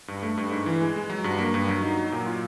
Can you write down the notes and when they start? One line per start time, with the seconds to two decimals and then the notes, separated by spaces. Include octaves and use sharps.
0.08 G2
0.23 A3
0.37 G2
0.51 G#2
0.66 E3
0.81 G#3
0.96 G#3
1.10 F#3
1.24 G2
1.39 A#3
1.54 G2
1.68 F#3
1.82 D#4
1.98 F#3
2.12 A#2
2.26 F4